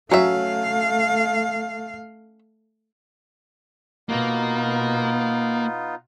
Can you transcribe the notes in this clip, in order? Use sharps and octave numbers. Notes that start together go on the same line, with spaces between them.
F#3 A3 C#4 E5 F5
B2 A#3 B3 D#4 F4